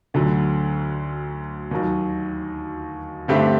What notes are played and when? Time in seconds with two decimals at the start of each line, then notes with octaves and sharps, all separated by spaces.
0.14 D2 D3 F#3
1.71 D#2 D#3 F#3
3.28 G2 D3 A3 C4 G4